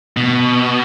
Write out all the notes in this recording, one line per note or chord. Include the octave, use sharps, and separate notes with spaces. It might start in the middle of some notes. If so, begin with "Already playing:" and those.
B2